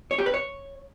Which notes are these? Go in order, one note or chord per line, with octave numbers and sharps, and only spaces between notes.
C#5
G4
B4
C#5